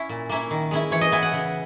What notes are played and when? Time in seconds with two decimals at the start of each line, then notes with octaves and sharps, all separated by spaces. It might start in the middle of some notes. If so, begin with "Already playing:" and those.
Already playing: C#4 E4
0.09 A#2
0.29 A#3 C#4 E4
0.51 D#3
0.71 G#3 C#4 E4
0.92 E3 C#5
1.01 D#5
1.12 B3 E4 G#5
1.23 F#5
1.33 C#3